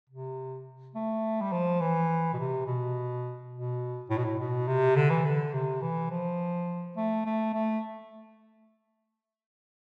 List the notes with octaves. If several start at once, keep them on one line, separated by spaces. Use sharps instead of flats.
C3
A3
G3
F3
E3
B2
C3
B2
B2
A2
B2
A2
B2
C3
D3
E3
D3
C3
E3
F3
A3
A3
A3